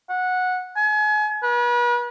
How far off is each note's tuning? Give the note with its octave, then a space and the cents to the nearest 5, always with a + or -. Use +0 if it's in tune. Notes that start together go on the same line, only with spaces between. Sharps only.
F#5 -15
G#5 +35
B4 -40